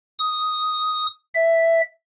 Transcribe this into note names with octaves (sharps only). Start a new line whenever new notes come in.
D#6
E5